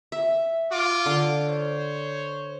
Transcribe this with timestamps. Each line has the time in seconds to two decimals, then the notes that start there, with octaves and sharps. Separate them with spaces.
0.12 E5
0.70 F4 D6
1.06 D3
1.49 C5 C#5